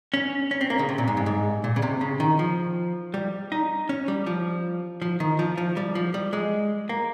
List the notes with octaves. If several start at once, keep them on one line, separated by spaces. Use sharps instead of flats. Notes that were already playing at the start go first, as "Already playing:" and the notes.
C#4
C#4
C4
A#3
C#3
C3
A#2
G#2
G2
G#2
A#2
C#3
C3
C#3
D#3
F3
G3
D#4
C#4
G3
F3
F3
D#3
F3
F3
G3
F3
G3
G#3
A#3